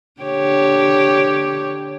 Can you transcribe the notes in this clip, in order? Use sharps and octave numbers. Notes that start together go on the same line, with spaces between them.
D3 G4 C#5